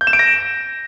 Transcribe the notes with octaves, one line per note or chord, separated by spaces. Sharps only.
G6
E7
D7
A#6